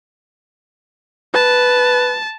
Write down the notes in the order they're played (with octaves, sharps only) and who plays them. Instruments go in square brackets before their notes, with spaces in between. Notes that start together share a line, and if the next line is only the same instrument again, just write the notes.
[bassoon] B4 [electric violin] A5